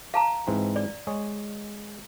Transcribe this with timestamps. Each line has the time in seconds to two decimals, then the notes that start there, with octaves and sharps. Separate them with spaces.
0.14 F5 A5 A#5
0.47 G#2 E3 C4
0.76 D5
1.07 G#3 G#4 C#5